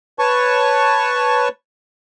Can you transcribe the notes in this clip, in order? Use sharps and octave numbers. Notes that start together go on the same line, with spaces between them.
B4 C#5 A5 C#6